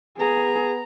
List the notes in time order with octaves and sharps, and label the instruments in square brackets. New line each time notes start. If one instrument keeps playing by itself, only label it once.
[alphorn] B3 [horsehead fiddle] G#4 [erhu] A#5